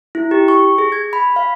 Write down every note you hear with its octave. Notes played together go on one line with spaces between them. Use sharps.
E4
G4
C#6
G#4
G#6
B5
F5